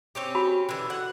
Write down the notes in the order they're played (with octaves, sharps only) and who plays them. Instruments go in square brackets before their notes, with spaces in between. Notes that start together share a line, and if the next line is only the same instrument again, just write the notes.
[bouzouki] C4 C#4 G4
[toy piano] F#4 B5
[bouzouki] D3 E3
F#5